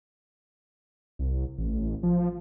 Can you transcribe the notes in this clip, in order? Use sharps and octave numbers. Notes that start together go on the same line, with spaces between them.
C2
A1
F3